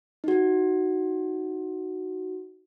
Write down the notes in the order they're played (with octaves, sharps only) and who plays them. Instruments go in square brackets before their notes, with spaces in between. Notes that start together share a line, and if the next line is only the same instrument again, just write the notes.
[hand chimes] D#4 F#4